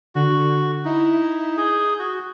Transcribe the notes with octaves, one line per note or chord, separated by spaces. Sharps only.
D3 F#4
D#4 E4
G#4 G6
F#4